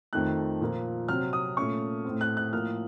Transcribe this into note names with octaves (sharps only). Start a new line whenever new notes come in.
F2 D#3 A3 F#6
A#2 F3 A#3
C3 F#3 C4 F6
D#6
A#2 A3 C#4 C#6
A2 A3 C4
F#6
F#6
A2 F3 A#3 F6